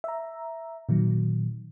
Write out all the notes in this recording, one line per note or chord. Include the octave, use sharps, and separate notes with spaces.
E5 A#5
A#2 D#3 F#3